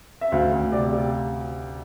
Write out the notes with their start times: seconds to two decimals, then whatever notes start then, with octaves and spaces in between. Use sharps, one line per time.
0.21 E5
0.32 D2 F5
0.52 D2
0.72 C3 D5
0.93 C3